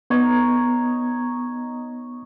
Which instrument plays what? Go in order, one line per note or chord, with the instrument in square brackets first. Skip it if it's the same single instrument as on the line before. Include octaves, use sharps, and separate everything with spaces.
[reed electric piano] B3 [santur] D#4 C#5 A#5